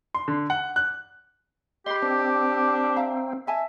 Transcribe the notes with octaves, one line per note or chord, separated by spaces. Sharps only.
C6
D3
F#5
F#6
G4 B4 D#5 C6
C4 D4
E5 F5 A#5
D#5 E5 G#5 A5